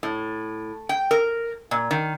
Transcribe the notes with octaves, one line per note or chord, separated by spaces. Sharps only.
A2
G5
A#4
A#2
D#3